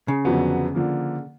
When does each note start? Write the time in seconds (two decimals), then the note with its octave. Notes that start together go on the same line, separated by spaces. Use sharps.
0.08 C#3
0.25 F2 D3 F#3 B3
0.75 D3 F3 A#3